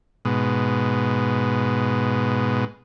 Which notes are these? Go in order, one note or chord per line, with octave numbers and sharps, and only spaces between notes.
G#2 B2